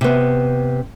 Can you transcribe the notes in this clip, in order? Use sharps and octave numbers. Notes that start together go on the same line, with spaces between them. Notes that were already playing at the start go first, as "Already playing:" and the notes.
C3 B3